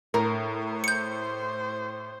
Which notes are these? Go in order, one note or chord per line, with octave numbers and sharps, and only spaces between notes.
A2 A#4
C5 G6 C#7